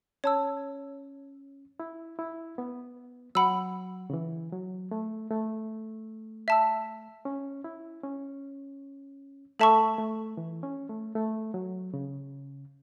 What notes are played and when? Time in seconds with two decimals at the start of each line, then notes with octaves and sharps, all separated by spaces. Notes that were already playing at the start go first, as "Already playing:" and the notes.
0.24 C#4 C#5 A5 E6
1.80 E4
2.19 E4
2.58 B3
3.35 F#3 F#5 B5 E6
4.10 C#3
4.13 E3
4.53 F#3
4.91 A3
5.31 A3
6.48 E5 A5 E6
7.25 C#4
7.64 E4
8.04 C#4
9.60 A3 A4 E5 A5 C#6 E6
9.98 A3
10.37 E3
10.63 C#4
10.89 A3
11.15 A3
11.54 F#3
11.94 C#3